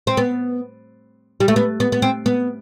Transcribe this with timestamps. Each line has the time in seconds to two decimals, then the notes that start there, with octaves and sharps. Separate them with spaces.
0.07 C4
0.17 B3
1.40 G3
1.48 A3
1.56 B3
1.80 B3
1.92 B3
2.02 C4
2.26 B3